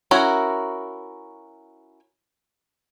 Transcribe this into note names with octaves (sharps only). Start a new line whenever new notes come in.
C#4 E4 F#4 A#4